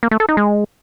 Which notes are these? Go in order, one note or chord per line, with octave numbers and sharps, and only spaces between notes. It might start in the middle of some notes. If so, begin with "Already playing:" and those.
A#3
A3
A4
D#4
G#3